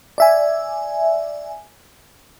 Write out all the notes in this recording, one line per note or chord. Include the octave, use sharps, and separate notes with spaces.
D5 E5 G#5